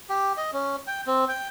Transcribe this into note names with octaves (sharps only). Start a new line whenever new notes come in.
G4
D#5
C#4
G5
C4
G5